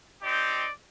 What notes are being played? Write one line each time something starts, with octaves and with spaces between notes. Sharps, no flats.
C4 D#4 G4 D5